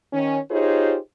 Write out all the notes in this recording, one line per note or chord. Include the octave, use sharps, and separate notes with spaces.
D#3 C#4
D#4 F4 G4 G#4 C5 C#5